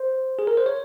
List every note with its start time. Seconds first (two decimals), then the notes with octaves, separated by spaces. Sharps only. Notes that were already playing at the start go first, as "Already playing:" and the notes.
Already playing: C5
0.39 G#4
0.47 A#4
0.57 C5
0.66 C#5